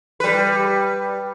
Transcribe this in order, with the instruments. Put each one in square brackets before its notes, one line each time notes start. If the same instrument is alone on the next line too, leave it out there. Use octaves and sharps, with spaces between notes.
[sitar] G3 B4